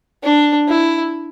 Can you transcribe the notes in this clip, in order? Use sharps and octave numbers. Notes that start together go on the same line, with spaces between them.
D4
E4